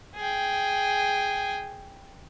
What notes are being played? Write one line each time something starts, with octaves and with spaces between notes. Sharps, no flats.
G#4 G5